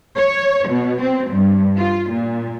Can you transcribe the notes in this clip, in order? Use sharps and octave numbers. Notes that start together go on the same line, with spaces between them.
C#5
B2
C4
G2
F4
A#2